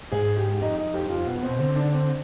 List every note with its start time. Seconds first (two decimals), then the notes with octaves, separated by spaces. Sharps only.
0.12 G#2 G#4
0.37 G4
0.61 F2 D#4
0.78 D#4
0.94 F2 G4
1.05 G2
1.10 F2 F4
1.26 B2 B3
1.42 B2 C4
1.59 D3 C4
1.76 D4
1.93 C4